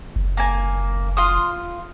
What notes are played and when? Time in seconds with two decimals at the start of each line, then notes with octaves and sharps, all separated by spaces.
0.16 F#1
0.37 A#3 G#5
1.17 F4 C6 D#6